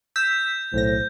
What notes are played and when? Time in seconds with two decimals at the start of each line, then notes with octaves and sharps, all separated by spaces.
0.16 E6 G6 B6
0.73 B1 A2 C5 A#6